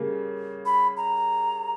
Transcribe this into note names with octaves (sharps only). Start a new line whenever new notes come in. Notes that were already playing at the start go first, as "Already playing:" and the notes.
Already playing: C#3 G3 A#3
B5
A#5